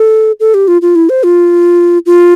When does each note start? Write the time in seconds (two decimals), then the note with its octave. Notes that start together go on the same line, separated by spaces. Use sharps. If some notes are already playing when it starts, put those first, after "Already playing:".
Already playing: A4
0.40 A4
0.54 G4
0.68 F4
0.82 F4
0.95 E4
1.09 C5
1.24 F4
2.06 F4